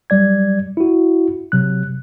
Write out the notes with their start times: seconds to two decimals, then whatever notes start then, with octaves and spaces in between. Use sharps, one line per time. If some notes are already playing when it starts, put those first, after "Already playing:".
0.10 F#3 G3 D5 G#6
0.77 E4 F#4
1.52 C3 F#3 F#6